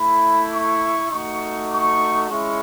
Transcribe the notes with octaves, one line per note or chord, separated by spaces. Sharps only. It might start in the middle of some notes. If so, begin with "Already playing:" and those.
Already playing: A3 E4 B5
C#6
A3 D#4 F#4 C#6
C#6
G#3 C#4 E4 C#6